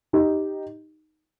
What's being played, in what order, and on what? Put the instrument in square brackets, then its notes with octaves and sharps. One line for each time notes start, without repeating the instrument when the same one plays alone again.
[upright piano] D#4 G4